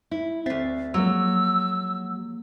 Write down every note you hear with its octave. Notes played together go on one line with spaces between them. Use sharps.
E4
D2 C4 E5 A6 C7
F3 F#3 G#3 A#3 E6